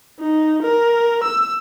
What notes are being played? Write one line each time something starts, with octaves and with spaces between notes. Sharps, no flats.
D#4
A#4
E6